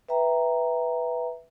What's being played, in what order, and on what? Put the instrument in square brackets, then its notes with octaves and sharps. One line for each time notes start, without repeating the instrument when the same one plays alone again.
[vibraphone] B4 E5 G5 A#5